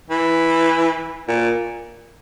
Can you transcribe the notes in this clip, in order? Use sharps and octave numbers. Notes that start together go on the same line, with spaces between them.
E3
A#2